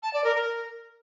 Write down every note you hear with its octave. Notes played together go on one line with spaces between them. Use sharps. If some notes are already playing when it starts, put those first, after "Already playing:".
A5
D5
A#4
A#4